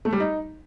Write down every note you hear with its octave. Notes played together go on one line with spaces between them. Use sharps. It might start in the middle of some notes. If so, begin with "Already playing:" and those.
A3
G3
D#4